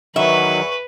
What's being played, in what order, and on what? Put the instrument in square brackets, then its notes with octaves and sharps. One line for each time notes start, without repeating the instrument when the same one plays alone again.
[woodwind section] E2 E3 C#6 [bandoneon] D#3 F#3 [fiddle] B4 [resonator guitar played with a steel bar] E5